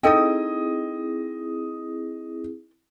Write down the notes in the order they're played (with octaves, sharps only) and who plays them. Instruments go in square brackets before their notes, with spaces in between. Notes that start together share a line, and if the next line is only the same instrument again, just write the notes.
[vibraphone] C4 E4 G#4 [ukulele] D#4 A4 G5 [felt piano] D#5 D#6